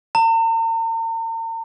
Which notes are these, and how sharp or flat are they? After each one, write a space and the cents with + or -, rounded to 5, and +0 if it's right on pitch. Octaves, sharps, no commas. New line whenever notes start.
A#5 -45